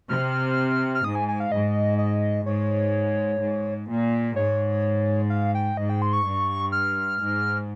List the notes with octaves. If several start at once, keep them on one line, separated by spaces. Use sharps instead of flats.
C3 F6
F6
G#2 D#6
G#5
G#5
F5
G#2 D#5
D#5
G#2 C#5
G#2
A#2
G#2 C#5
F5
G5
G#2 D#5
G5
C6
C#6
G2
F6
G#2